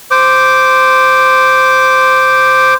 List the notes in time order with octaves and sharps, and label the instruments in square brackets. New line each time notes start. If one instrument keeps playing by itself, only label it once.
[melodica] C5 D6